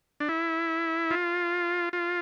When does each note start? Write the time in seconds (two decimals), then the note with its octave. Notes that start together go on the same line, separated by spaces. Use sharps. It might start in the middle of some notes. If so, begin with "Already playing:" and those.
0.20 D4
0.29 E4
1.11 F4
1.93 F4